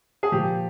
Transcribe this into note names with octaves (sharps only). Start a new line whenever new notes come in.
G#4
A#2 F3 G4